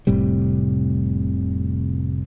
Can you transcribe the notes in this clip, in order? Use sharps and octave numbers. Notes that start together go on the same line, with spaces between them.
F1 A2 C3 G3